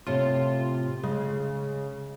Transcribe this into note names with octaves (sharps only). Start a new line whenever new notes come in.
A2 C3 F4
C#3 G#3